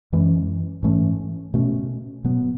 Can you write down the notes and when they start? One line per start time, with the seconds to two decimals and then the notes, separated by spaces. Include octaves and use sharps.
0.12 F#2 E3 G#3 C#4
0.83 G#2 E3 A3 C#4
1.54 B2 A3 C#4
2.24 B2 F#3 B3